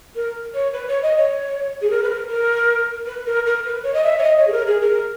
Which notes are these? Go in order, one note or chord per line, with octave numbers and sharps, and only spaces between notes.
A#4
C#5
B4
C#5
D#5
C#5
G#4
A#4
B4
A#4
A#4
B4
A#4
A#4
B4
C#5
D#5
E5
C#5
D#5
C#5
G#4
A#4
G#4
A#4